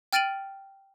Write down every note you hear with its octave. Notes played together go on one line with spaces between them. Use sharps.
G5 F6 A6 D7 D#7 F#7